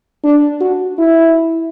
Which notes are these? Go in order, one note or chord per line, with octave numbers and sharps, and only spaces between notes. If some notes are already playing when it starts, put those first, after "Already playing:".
D4
F#4
E4